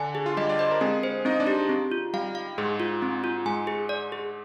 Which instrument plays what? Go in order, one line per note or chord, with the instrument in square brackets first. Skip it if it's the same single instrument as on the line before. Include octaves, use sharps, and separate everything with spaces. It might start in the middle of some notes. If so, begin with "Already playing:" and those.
Already playing: [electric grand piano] D3 D4 [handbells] G#5
[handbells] G#4
[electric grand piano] F4
[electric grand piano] G3 G4 [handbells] D#5
[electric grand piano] D5
[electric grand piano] C5 [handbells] D#5
[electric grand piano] A#4
[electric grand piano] G#3 G#4 [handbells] C4
[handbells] C5
[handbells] C4 [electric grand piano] D#4 D#5
[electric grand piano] D4 D5
[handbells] G4
C4
F4
[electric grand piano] G3 [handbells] F5
[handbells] F5
[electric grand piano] G#2 G#3 [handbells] G#4
[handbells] F4
C4
F4
[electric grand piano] G#2 G#3 [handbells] G#5
[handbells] G#4
D5
G#4